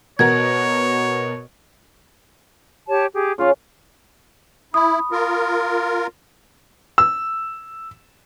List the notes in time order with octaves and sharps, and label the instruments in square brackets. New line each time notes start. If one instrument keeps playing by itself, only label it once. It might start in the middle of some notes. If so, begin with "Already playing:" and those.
[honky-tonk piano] B2 F#4 A#4 [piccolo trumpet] C#5 [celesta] G#6
[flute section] G4 C#5 A5
G4 G#4
[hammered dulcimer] C#3 C#4 [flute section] F4
[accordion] E4 [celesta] B5 D#6
[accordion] F4 A#4
[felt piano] E6